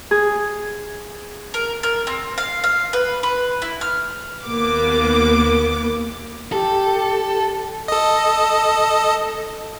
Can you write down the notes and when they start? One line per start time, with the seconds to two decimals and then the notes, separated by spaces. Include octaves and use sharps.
0.11 G#4
1.54 A#4
1.83 A#4
2.07 C4
2.38 F5
2.64 F5
2.93 B4
3.23 B4
3.62 E4
3.81 F6
4.45 D#2 A#3 B3 D6
6.52 G4 A4
7.88 A4 D#5